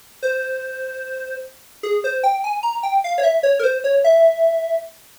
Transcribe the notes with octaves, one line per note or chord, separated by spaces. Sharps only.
C5
G#4
C5
G5
G#5
A#5
G5
F5
C#5
E5
C#5
A#4
C5
C#5
E5